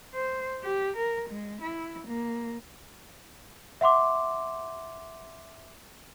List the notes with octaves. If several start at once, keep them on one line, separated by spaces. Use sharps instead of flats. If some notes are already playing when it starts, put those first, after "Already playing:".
C5
G4
A#4
G#3
E4
A#3
E5 F#5 C6 D6